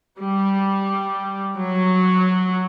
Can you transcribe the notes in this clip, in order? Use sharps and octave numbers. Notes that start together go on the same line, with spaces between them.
G3
F#3